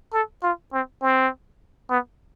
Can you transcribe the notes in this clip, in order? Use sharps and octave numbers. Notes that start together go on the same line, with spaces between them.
A4
F4
C4
C4
B3